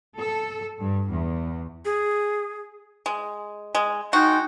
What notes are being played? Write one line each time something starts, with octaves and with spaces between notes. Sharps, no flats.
A4
G2
E2
G#4
G#3
G#3
G#3 D#4 F#4 G5